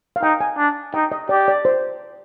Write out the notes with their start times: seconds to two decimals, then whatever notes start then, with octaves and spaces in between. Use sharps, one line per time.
0.16 F5
0.23 D#4 G5
0.41 G#5
0.58 D4
0.94 D#4 G5
1.12 D#5
1.29 G4 D5
1.48 D5
1.65 C5